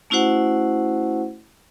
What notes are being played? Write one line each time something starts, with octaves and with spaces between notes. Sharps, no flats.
A3 C#4 E4 F#4 C5 F#5